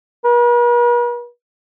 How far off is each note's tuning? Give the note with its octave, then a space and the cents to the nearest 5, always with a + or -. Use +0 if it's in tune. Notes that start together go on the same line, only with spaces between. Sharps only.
B4 -45